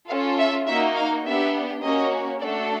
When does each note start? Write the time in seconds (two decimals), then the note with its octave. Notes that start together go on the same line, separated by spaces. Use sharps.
0.10 C#4 F4 A4 F5
0.39 E5
0.67 A#3 D#4 F#4 E5
0.96 F5
1.25 B3 D4 G4 E5
1.83 A#3 C#4 F#4 D#5
2.41 A3 D4 F#4 A4 D5